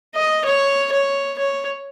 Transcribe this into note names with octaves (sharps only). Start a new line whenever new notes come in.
D#5
C#5
C#5
C#5